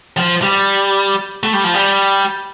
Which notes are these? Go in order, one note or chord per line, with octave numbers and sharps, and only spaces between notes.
F3
G3
A3
G3
F3
G3